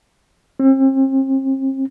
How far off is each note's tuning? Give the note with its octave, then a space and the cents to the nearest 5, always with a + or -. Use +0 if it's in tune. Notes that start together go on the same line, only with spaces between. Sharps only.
C4 +40